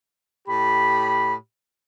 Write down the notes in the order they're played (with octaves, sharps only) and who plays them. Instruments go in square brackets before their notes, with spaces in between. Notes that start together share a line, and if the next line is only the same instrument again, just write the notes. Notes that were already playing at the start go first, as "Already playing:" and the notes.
[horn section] A2 G4 B5